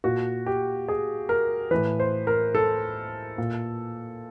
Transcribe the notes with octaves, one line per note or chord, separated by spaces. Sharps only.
A#2 F#4
G4
G#4
A#4
A2 E3 B4
C5
A#4
A4
A#2